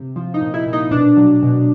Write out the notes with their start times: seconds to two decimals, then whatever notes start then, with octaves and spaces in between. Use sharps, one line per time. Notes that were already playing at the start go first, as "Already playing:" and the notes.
Already playing: C3
0.16 F3
0.34 D#4
0.41 A#2
0.54 E4
0.66 A#2
0.73 D#4
0.91 B2 D4
1.17 F#3
1.42 B2